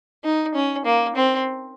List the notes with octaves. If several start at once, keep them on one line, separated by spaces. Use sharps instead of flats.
D#4
C#4
A#3
C4